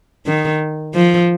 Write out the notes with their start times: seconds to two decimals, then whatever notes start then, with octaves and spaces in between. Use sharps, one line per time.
0.26 D#3
0.95 F3